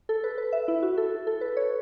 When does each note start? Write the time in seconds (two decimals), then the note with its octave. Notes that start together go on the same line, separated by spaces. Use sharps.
0.09 A4
0.24 B4
0.38 B4
0.52 E5
0.68 E4
0.83 F#4
0.97 A4
1.27 A4
1.41 B4
1.57 C#5